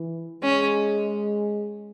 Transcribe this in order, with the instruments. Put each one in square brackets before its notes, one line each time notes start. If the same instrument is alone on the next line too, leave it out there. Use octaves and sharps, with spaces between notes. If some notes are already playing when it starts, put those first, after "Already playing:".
Already playing: [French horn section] E3
[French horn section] G#3 [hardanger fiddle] C#4